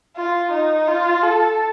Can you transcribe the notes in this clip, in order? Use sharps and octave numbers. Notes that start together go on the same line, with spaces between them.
F4
D#4
F4
A4